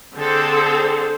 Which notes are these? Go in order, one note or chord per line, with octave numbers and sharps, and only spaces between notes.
D3 C4 G#4 A4 C5